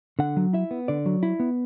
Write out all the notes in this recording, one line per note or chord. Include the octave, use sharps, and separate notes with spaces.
D3 F#5
F#3
E4 E5
B3
D3 D5
F#3
E4
B3